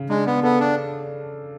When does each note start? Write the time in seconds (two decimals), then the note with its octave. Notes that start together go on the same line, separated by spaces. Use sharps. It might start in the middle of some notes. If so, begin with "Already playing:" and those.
Already playing: C#3
0.09 G#3 D4
0.27 B3
0.43 B3 A4
0.60 D4